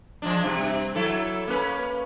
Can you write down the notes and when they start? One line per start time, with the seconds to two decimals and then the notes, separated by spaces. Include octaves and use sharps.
0.22 F3 G#3 D4
0.44 G2 C3
0.95 F#3 E4 A4
1.47 A#3 C#4 B4